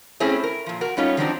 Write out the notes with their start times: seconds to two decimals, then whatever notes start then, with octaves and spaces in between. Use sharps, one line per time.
0.20 A3 C4 C#4 E4 G#4
0.44 A#4
0.66 A#2 F3
0.81 F#4 A#4
0.97 G3 A3 C#4 D#4 F4 C#5
1.17 D#3 F3 F#3 C4 D4 D#4